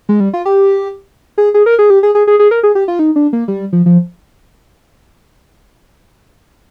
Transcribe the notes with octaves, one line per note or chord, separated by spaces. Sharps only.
G#3
G3
F4
G4
G#4
G#4
A#4
G#4
G4
G#4
G#4
G#4
G#4
A#4
G#4
G4
F4
D#4
D4
A#3
G3
F3
F3